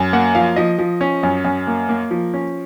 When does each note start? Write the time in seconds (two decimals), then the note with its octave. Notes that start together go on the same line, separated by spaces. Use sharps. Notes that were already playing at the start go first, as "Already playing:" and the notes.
Already playing: F#2
0.13 A#3 F#5
0.35 F3 F5
0.56 F3 D#5
0.79 F3
1.01 C#4
1.23 F#2
1.44 F#2
1.67 A#3
1.89 A#3
2.11 F3
2.34 C#4